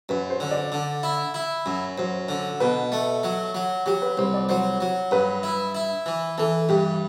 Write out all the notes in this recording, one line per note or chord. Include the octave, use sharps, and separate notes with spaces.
F#2 B4
C5
D3
D5
D3
E4
E4
F#2
F#2 C5
D3
B2 B4
A3
F#3
F#3
F#3 G4
B4
C2 C5
D5
F#3 C5
F#3
G2 B4
E4
E4
E3
E3 A4
G2 G4